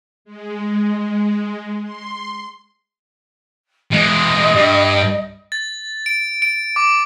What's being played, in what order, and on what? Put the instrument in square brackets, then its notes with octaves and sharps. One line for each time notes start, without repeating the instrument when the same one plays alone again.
[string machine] G#3
C6
[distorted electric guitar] E3 G#3 [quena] D#5
[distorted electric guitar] G2
[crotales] A6
D7
D7
D6